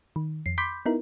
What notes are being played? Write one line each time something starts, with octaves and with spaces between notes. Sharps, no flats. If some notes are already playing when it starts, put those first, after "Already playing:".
D#3
F2 C7
B5 C6 D6 G6 B6
B3 D#4 E4 A#4